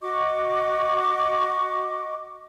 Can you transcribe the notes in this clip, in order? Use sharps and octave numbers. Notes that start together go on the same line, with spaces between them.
F#4 D#5 C#6 D6